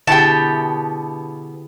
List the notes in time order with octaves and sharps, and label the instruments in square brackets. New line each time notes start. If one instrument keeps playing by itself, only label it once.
[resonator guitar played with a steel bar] B2 B3 G4 [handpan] D3 E4 G#4 [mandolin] G5 A5